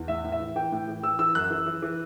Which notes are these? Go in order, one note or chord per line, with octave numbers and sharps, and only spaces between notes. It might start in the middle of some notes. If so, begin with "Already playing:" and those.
Already playing: E2
A2 E5
A2
E5
E3
E3 G5
A2
E3
E3 E6
E3 E6
F#2 F#6
E3
E3
E3